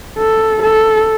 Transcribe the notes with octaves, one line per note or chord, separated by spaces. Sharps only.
A4
A4